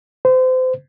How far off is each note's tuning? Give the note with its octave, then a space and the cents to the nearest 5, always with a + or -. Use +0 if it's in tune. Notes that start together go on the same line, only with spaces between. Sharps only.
C5 -30